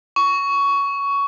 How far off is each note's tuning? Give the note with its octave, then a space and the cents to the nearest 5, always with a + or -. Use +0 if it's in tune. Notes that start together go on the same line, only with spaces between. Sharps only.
C#6 +15